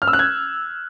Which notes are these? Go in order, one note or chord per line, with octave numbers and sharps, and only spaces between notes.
F6
E6
F#6
G#6